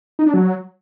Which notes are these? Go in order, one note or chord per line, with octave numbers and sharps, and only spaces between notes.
D#4
D4
F#3